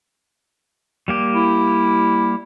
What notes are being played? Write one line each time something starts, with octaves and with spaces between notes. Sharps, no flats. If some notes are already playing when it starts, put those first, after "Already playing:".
G3 A#3 G4
E4